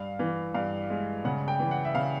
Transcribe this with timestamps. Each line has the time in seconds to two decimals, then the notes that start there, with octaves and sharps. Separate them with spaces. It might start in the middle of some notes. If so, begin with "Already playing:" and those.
Already playing: G2 F5
0.19 E3
0.54 G2 F5
0.90 G#3
1.25 C#3 F#5
1.48 G5
1.60 E3
1.71 F#5
1.85 E5
1.95 C#3 F5